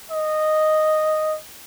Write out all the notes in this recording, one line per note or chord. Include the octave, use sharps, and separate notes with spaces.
D#5